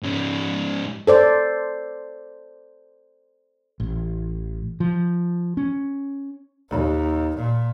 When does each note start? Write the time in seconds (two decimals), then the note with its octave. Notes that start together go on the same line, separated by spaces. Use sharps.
0.03 G#2 C#4
1.07 A4 C5 D5
3.80 A1
4.80 F3
5.57 C#4
6.70 D#2
7.36 A#2